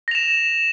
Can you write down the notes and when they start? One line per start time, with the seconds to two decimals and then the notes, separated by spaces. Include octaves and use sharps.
0.08 A#6
0.11 F7
0.15 E7